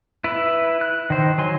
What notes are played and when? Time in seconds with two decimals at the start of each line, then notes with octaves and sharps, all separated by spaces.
0.24 E4 B4
0.81 F#6
1.10 D#3 C5
1.38 F#3 G#5 C6